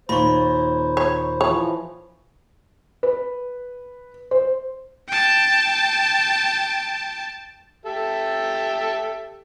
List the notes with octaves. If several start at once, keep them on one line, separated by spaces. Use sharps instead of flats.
D#2 A#2 C5 B5 C#6
C#5
E3 F3 C#5
B4
C5
G5 A5
G4 A4 E5